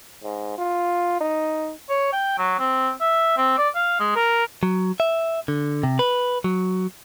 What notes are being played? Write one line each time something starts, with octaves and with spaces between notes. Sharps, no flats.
G#2
F4
D#4
C#5
G5
F#3
C4
E5
C4
D5
F5
G#3
A#4
F#3
E5
D3
C3
B4
F#3